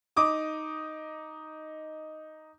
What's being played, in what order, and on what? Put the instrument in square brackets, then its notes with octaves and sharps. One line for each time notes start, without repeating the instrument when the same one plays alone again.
[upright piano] D#4 D6 D#6